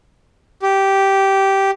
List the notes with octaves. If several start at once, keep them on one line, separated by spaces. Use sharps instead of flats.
G4